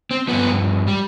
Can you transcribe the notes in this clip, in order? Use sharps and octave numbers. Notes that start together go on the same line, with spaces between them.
C4
G2 F3 B3
G3